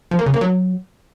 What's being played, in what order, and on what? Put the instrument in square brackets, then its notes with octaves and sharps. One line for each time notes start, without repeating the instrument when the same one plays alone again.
[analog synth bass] F3
A#3
C#3
A#3
F#3